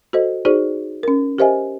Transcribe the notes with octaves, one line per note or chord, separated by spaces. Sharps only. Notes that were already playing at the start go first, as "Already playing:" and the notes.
F#4 A4 C5 D#5
D#4 F#4 G#4 C5 D5
C#4 A#4
G4 A#4 C5 D#5 E5 G#5